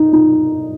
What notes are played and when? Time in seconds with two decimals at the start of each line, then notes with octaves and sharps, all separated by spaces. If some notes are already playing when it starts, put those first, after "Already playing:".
Already playing: D#4
0.13 D#4